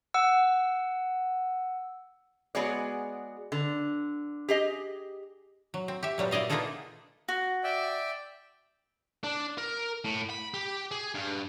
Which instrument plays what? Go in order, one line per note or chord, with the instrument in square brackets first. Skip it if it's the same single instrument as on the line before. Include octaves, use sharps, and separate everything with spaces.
[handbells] F#5 E6
[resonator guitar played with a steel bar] G#3 B3 F#4 G#4 C#5 D5
D3
G4 G#4 D#5
[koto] F#3
C4
G4 E5
A#2 F#3 G3 B3
E4 D5 D#5 F5
A#3 B3 D#4 F4 G#4 A4
[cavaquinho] F#4
[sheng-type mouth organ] D5 E5 G5
[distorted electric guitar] D4
A#4
A2
B5
G4
G#4
G2